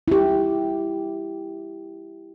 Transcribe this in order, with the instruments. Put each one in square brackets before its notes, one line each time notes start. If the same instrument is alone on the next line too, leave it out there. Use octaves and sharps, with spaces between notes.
[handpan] E4 G4